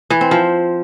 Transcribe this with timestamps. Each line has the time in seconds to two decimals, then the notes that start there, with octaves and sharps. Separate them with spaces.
0.10 E3
0.21 C4
0.31 F3